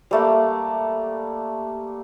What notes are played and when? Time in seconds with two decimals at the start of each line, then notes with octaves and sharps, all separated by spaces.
0.11 G3 A3 A#3